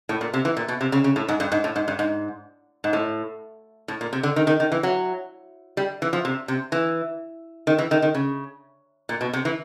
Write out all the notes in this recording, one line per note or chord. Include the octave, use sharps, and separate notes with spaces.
A2
A#2
C3
E3
A#2
B2
C3
C#3
C#3
A2
G#2
G2
G#2
A2
G#2
G2
G#2
G#2
A2
A2
A#2
C3
D3
D#3
D#3
D#3
E3
F#3
G3
E3
F3
C3
C3
E3
D#3
E3
D#3
D#3
C#3
A#2
B2
C3
E3